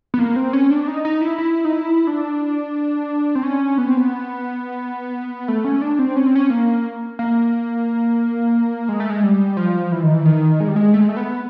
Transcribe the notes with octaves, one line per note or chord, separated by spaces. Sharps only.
B3
A#3
C4
C#4
D4
D#4
D#4
E4
E4
D#4
E4
D4
C4
C#4
B3
C4
B3
A3
C#4
D4
C4
C#4
C4
C#4
A#3
A#3
G#3
A3
G#3
G3
F3
E3
D#3
E3
D#3
G#3
G3
G#3
A3
G#3
A3
B3